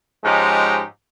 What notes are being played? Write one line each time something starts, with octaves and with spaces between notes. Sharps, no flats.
G#2 F3 G#3 C#4 D#4 G4